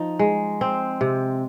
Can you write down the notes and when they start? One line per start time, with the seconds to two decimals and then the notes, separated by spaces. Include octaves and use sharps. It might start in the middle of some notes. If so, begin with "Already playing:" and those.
Already playing: F3 D#4
0.19 G#3
0.61 C4
1.01 C3